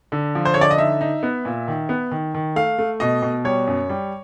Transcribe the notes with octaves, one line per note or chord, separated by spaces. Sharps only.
D3
F3
C5
D3 C#5
D5
D#5
D#4 E5
D#4
B3
A#2
D#3
B3
D#3
D#3
A3 F5
A3
B2 D#5
B2
G3 C#5
F#2
G3